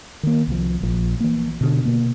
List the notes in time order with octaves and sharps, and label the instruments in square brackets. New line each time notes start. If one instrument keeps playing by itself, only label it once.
[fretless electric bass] D#3 A#3
C2 F3
A#1 F3
E3 A#3
B2 D3
B2 A#3